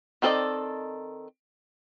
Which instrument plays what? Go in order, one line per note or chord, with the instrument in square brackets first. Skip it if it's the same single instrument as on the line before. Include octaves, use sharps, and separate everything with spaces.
[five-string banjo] D#3 C4 A4 D5 D#5